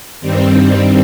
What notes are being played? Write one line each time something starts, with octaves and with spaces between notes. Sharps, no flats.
G2 D#3 G3 C4